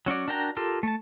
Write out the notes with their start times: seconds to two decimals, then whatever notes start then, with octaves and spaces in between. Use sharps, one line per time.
0.06 F#3 C#4 F#4 D5
0.28 D4 F#4 A#4 G5 A#5
0.57 F4 G4 A4 A#4
0.83 A3 A5